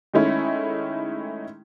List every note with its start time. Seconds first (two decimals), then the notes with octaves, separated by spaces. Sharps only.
0.14 D#3 G#3 A3 C#4 E4